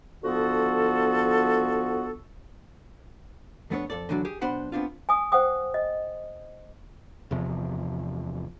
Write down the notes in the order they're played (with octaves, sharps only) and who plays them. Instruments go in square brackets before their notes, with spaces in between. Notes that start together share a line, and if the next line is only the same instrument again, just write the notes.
[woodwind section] D3 F3 B3 F#4 A4
[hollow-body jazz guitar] F2 A3 B3 D4 E4 C#5
F2 A4 D5
D3 E3 F#3 D4 F#4
G4 G#4
B1 B3 D4 C5 F#5 B5
B3 C4 D4 F4
[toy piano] G#5 D#6
C5 F#5 G5 D#6
D#5
[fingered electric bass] E2 C3 F3